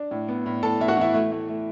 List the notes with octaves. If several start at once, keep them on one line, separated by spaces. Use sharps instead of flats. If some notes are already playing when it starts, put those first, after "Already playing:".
Already playing: D4
A2
B3
A2
A2 A4 A5
A2 E5
F#4 F#5
E3 E4 E5
A3
A3
A3